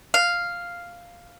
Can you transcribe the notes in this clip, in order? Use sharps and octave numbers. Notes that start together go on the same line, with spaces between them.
F5